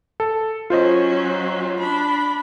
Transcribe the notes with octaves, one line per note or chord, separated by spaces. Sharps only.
A4
F#3 C#4 F4 C5 D#5
D4 B5